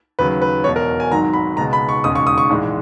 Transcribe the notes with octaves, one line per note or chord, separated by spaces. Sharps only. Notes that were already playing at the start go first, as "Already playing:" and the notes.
D#2 C#3 F#3 B4
B4
E1 E2 B2 C#5
A#4
G#5
G#1 G#2 D#3 F#3 A#5
B5
C#2 B2 G#3 A#5
B5
C#6
E1 D#2 C#3 G#3 D#6
C#6
D#6
C#6
A#1 G#2 E3 G#3